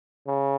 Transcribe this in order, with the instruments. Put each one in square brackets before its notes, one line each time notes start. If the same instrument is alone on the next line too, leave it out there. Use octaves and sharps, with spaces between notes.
[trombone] C#3